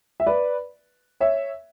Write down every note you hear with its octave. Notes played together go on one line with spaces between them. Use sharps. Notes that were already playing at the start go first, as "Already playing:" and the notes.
E5
B4 D5
C#5 E5